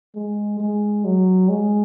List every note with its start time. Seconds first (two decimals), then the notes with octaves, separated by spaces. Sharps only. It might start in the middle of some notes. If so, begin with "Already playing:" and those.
0.15 G#3
0.60 G#3
1.05 F#3
1.49 G#3